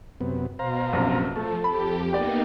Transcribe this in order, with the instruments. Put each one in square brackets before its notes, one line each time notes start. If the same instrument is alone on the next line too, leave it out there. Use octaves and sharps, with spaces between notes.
[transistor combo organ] F#2 C3 B3
[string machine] B2 [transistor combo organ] C5 F5 A#5
[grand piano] A#1 F#2 C3
[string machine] F3 [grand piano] A3 [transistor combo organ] A4
[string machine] F2 G4 [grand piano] B5
[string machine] A#3 B3 D#4 [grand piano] G4 D5 G5